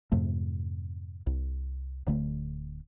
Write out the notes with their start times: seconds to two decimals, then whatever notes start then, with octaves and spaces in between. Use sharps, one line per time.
0.12 F2 G#2 C3 A3
1.26 C2
2.07 D1 D3 A3